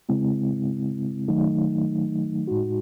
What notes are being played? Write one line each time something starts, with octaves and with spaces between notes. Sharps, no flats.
C#3 G#3 C4 E4
D#3 F#3 A3 D#4
A2 G#3 D#4 F#4